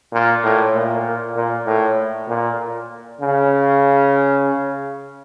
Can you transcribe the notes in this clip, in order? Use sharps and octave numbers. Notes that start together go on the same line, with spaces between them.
A#2
A2
A#2
A#2
A2
A#2
C#3